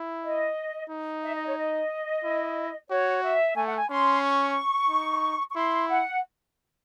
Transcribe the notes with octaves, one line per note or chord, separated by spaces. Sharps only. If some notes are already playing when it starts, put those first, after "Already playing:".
Already playing: E4
D#5
D#4
E5
D#5
C#5
D#5
E4
F#4 C#5
E5
A3 G#5
F#5
G#5
C#4 C6
C#6
D#4
C#6
E4 C6
F#5